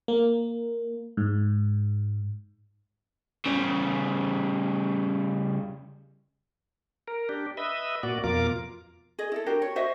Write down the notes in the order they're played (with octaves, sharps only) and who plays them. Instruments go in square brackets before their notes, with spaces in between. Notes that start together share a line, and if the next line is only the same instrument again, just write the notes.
[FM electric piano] A#3
G#2
[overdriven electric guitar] C#3 G3
[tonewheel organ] A#4
D4 G4
B4 D#5 E5
A#2 F#4 D5
F2 B2 F4 A#4 D6
[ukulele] G#4 D#5
E4 A4
D4 F#4 G4 A#4
C#5
F#4 C5 D#5 E5